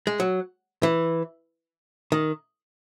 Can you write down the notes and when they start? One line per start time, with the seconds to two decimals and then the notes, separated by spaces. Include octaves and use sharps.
0.07 G#3
0.20 F#3
0.83 E3
2.12 D#3